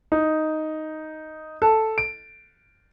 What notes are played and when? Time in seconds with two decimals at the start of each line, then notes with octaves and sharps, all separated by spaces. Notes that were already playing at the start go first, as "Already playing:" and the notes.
0.12 D#4
1.62 A4
1.98 D7